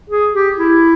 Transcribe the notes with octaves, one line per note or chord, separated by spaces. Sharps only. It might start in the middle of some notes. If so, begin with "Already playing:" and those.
G#4
G4
E4